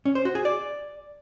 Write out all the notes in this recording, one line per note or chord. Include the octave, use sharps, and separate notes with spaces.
C#4
C5
F#4
G#4
D5